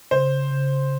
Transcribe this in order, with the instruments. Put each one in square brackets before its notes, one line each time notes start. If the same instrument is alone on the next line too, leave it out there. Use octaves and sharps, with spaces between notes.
[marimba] C#3 [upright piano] C5
[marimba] C#3